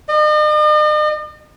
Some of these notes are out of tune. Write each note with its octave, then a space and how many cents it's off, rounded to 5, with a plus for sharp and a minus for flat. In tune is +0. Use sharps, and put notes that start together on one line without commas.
D#5 -45